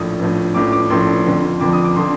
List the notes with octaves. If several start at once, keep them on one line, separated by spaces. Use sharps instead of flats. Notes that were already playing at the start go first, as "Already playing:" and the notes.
Already playing: A#1 A2 F3 D#6
A#1 A2 F3
A#1 A2 F3 D6
D6
A#1 A2 F3 C6
F2 D3 F3
F2 D3 F3 D6
D#6
D6
D3 F3 C6